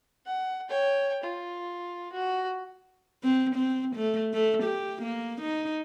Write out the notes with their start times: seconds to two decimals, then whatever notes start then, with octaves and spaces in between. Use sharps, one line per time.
0.26 F#5
0.69 C#5 G5
1.24 F4
2.12 F#4
3.24 C4
3.56 C4
3.96 A3
4.33 A3
4.63 G4
5.03 A#3
5.41 D#4